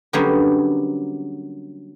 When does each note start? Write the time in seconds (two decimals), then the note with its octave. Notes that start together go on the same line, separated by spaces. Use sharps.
0.13 D3 F#3 G3 A#3 B3 C#4